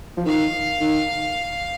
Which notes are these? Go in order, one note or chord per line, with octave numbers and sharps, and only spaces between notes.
F3
D#3 F5
D#3